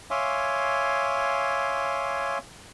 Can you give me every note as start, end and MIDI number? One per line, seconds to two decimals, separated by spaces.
0.10 2.38 73
0.10 2.38 76
0.10 2.38 77
0.10 2.38 80
0.10 2.38 84
0.10 2.38 86